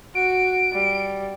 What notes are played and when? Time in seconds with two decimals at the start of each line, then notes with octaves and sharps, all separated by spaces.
0.15 F#4 D7
0.72 G3